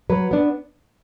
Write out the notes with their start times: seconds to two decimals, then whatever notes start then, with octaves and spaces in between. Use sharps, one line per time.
0.10 F#3 B4
0.31 B3 D4